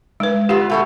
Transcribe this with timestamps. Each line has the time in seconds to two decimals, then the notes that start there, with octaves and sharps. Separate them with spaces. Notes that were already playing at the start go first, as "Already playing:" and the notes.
0.20 G#3 B4
0.49 F2 B3 F4 G4
0.70 B2 A3 F#4